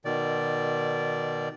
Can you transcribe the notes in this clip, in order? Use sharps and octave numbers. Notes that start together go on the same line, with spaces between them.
B2 D#3 D5